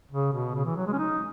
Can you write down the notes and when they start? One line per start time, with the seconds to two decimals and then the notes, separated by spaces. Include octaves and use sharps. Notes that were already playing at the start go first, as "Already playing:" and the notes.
0.11 C#3
0.33 B2
0.55 C#3
0.65 E3
0.76 F#3
0.87 G#3
0.93 C#4
0.99 D#4